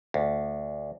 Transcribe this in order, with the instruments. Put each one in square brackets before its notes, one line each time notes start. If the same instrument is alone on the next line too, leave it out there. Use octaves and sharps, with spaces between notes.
[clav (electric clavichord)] D2